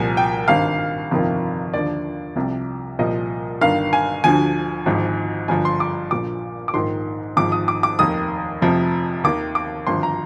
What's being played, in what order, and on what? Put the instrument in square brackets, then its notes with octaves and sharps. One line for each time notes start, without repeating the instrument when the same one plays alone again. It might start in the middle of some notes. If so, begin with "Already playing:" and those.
Already playing: [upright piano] C2 A#2 F3 G#5
G5
G#1 G2 D#3 F5
G1 F2 C3 D#3
D#2 D3 F3 D5
C2 C3 F3
C2 A#2 F3 D#5
G1 G2 D#3 F5
G#5
D2 D3 F3 G#5
G#1 G#2 F3
G1 G2 D3 F3 G#5
C6
D6
A#1 A#2 F3 D6
D6
A#1 G#2 D#3 C6
G#1 G#2 F3 D6
D#6
D6
D6
F1 D#2 D#3 D#6
F1 F2 C3 F3
D#2 D#3 D6
D6
G#1 G2 D3 F3 C6
A#5